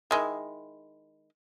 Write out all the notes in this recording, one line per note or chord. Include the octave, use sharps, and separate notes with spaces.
D#3 G#3 E4